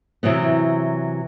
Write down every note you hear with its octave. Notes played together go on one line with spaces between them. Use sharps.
C3 E3 F#3 B3